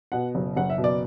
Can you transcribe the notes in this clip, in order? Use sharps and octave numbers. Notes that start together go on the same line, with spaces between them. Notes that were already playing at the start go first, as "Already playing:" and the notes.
B2 F#5
F#1
F#1 F#5
E5
B2
D5